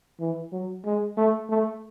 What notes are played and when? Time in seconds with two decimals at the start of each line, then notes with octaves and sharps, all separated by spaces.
0.20 E3
0.52 F#3
0.85 G#3
1.18 A3
1.50 A3